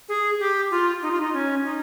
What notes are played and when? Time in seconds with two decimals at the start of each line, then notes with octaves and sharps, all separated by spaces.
0.09 G#4
0.40 G4
0.71 F4
1.02 D#4
1.11 F4
1.21 D#4
1.33 C#4
1.64 D#4